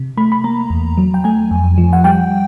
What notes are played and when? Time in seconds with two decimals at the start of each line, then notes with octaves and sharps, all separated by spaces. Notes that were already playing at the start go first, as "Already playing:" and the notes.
Already playing: C3
0.17 A3 B5
0.32 B5
0.44 A#3 A#5
0.70 E2
0.98 F#3
1.14 G5
1.24 A3 G#5
1.51 F2
1.78 F3
1.93 F#5
2.04 G3 G5